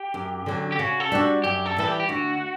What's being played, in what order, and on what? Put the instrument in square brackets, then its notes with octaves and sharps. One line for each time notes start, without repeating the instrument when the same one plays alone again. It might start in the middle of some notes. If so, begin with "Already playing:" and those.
Already playing: [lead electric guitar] G4
[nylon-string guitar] F#2
D3 F#3 C#4
[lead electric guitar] G4
[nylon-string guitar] C#3 [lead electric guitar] F#4
[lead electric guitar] A4
[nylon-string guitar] G3 D4 F#4
[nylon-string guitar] F#2 [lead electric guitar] G4
[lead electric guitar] A4
[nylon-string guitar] E3 G3 [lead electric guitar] A4
[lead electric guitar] G4
G4
[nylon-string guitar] D2 [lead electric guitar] F#4